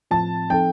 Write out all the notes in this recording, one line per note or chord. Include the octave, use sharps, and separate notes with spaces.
A2 F3 C4 F4 A5
F3 C4 D#4 A4 G5